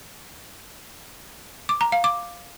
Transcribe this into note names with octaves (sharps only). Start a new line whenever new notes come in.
D6
A#5
F5
D6